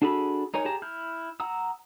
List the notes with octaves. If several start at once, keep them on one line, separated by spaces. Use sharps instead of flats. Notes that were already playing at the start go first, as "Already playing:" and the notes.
D4 F#4 G#4 A4 B5
D#4 A#4 C#5 G#5
G4 G#4 A5 A#5
E4 F6 G6
F#5 A#5 D#6 E6